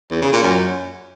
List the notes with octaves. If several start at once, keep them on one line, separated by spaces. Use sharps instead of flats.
E2
C#3
A#2
F#2